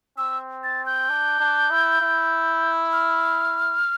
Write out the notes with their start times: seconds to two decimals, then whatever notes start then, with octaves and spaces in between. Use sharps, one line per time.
0.18 C4 E6
0.64 A6
0.86 G6
1.09 D4
1.40 D4
1.70 E4
2.01 E4
2.93 F6